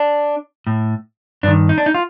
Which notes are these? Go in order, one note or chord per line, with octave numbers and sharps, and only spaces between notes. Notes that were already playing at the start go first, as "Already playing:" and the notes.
Already playing: D4
A2
G2 D#3 D4
D#4
D4
D#4
F4